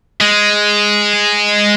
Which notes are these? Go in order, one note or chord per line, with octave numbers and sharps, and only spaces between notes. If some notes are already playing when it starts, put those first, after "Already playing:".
G#3